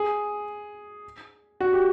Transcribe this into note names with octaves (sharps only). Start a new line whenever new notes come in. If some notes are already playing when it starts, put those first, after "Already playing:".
Already playing: G#4
F#4
G4